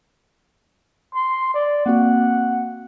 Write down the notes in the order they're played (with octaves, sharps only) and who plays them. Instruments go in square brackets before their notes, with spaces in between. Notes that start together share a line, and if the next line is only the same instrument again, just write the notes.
[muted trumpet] C6
D5
[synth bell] A#3 C4 F#4 [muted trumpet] F#5